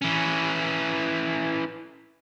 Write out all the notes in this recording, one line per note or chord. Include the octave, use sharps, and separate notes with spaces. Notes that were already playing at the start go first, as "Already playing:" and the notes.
E3 C#4